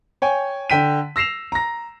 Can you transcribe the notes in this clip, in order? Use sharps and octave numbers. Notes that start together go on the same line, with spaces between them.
C#5 G5 G#5
D3 G5 B6 D#7
E6 A#6 C7 E7 F7
A#5 A#6